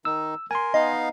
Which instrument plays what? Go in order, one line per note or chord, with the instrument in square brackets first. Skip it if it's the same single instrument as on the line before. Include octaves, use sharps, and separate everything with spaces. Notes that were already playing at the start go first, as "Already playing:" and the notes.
[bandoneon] D#3 D#4 [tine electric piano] E6
[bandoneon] A#4 [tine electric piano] G#5 C6
[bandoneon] B3 D#4 F5 [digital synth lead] D#5